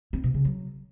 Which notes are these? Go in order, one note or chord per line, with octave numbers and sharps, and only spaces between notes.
C4
B2
C#3
F#3